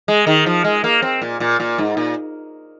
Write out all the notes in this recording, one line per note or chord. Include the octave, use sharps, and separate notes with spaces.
G#3
D#3
F3
G#3
A#3
C4
A#2
A#2
A#2
G#2
A#2